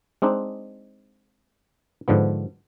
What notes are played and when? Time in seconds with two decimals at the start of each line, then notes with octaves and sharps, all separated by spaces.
0.22 G#3 C4 D4 D#4
2.08 G#2 D3 F3 B3